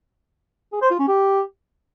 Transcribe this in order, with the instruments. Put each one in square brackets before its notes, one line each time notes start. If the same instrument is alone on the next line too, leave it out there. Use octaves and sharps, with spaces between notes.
[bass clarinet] G#4
C5
F4
C#4
G4